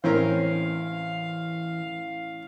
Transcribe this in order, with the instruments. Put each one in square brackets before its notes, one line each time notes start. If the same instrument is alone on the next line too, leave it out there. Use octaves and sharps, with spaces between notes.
[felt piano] A1 [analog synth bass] E3 [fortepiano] C4 C#4 A#4 [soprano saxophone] F5